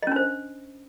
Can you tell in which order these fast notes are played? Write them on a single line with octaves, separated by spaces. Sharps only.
D#5 C#4 D4 C5